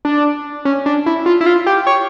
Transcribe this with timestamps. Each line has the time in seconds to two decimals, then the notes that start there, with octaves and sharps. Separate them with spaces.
0.05 D4
0.65 C#4
0.86 D4
1.06 E4
1.26 F4
1.41 E4
1.46 F4
1.67 G4
1.87 C#5